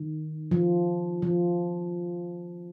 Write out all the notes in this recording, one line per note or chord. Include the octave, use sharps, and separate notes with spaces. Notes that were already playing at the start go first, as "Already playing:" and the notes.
Already playing: D#3
F3
F3